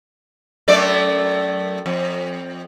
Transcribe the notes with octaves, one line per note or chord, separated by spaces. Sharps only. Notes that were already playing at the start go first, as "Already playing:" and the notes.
F#2 A3 D5
F2